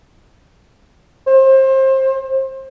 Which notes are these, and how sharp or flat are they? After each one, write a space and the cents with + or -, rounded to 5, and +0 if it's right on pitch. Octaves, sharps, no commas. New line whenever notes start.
C5 +25